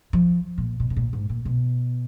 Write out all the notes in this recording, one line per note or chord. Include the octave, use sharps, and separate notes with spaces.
F3
A#2
B2
B2
A#2
G#2
A#2
B2